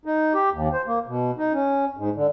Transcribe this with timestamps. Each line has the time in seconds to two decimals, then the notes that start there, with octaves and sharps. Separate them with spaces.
0.05 D#4
0.34 G4
0.53 D#2
0.73 C5
0.86 A#3
1.07 B2
1.38 D#4
1.53 C#4
1.97 G#2
2.16 D3